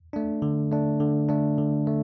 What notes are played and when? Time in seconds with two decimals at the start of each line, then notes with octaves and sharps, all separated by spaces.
0.13 A3 D4
0.42 D3
0.71 A3 D4
1.00 D3
1.29 A3 D4
1.58 D3
1.87 A3